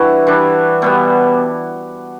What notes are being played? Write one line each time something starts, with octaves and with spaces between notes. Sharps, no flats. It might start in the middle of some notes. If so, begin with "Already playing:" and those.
Already playing: E3 G3 D4 E4 F#4
E3 G3 D4
B2 G3 B3